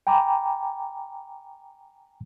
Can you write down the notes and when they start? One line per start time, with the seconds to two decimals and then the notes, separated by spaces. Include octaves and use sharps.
0.07 G5 G#5 A#5 B5 D6